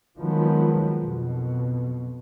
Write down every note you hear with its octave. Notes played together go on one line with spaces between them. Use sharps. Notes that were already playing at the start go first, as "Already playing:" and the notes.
D#3 F3 F#3 G#3 B3
B1 F2 B2